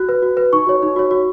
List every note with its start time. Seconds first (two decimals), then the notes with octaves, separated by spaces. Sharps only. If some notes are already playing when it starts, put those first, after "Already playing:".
Already playing: F#4 F#6
0.09 B4
0.22 F#4
0.37 B4
0.53 D#4 C#6
0.67 F#4 C#5
0.82 D#4
0.96 F#4 C#5
1.11 F#4